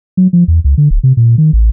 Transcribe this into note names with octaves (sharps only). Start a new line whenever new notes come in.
F#3
F3
E2
C#2
D3
D1
C3
A#2
D#3
A1